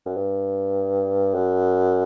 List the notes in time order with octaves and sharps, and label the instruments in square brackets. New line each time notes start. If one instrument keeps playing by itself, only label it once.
[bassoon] F#2
G2
F#2